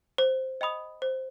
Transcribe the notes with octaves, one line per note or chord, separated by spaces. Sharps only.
C5
D#5 G5 B5 D#6
C5